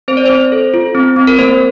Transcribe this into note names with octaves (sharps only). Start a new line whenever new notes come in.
C4 C5
D5
C4 C5
A4
F4
C4
C4
A#4
A#3 C5